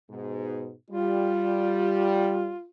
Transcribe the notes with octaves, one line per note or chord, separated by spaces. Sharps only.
G#2 B2
G3 F4